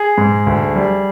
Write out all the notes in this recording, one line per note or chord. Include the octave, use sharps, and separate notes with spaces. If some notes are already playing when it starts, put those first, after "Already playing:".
Already playing: G#4
G#2
D2
G3